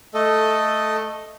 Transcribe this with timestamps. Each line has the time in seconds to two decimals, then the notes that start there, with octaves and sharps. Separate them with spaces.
0.14 A3 A4 D#5